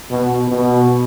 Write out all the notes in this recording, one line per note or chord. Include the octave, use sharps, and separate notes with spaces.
B2
B2